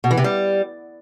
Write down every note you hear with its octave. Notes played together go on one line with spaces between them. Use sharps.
B2
E3
C3
G3